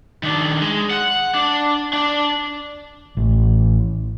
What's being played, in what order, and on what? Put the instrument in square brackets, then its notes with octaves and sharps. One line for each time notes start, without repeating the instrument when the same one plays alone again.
[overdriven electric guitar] D#3 D4
G#3
F#5
D4
D4
[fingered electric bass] A1